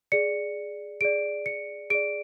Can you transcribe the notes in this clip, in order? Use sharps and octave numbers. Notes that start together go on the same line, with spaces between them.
G#4 D5 C#7
G#4 D5 D7
C#7
G#4 D5 D7